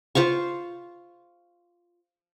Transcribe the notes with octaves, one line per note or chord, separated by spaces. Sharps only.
F4 C5 F5 C#6